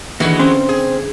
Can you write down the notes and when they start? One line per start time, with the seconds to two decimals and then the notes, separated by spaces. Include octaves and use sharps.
0.20 D#2 D3 E3 G#3 F#4
0.40 C4 C#4 F5
0.69 G#4